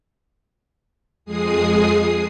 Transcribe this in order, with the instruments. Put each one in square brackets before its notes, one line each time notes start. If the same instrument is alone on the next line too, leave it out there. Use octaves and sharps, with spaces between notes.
[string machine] F2 G#3 G#4 D#6 C7